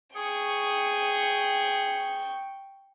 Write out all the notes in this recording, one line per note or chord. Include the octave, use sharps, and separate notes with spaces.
G#4 G5 C#6